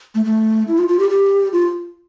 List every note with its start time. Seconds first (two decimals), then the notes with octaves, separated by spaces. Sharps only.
0.15 A3
0.25 A3
0.68 E4
0.78 F4
0.89 F4
0.99 G4
1.10 G4
1.53 F4